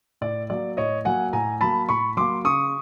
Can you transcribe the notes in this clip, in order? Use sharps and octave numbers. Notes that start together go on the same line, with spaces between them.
A2 D5
F#3 A#3 D5
A2 C#5 D#5
F#3 A#3 F#5 G#5
A2 G#5 A#5
F#3 A#3 A5 B5
A2 B5 C#6
F#3 A#3 C6 D6
C#3 C#6 D#6